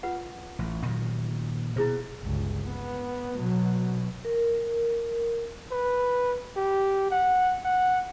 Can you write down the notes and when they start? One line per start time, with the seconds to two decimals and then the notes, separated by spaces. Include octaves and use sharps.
0.03 F4 B4 F#5
0.59 A1
0.86 A#2 D#3 F#3
1.76 B2 E4 G#4 C5
2.19 G1 C#2
2.67 B3
3.36 B2 F#3
4.25 A#4
5.71 B4
6.56 G4
7.11 F#5
7.64 F#5